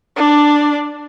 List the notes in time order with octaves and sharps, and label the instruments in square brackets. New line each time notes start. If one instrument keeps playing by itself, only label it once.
[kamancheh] D4 D5